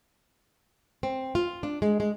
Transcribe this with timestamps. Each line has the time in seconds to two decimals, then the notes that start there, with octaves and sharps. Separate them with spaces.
1.03 C4
1.35 F4
1.63 D4
1.82 G#3
2.00 G#3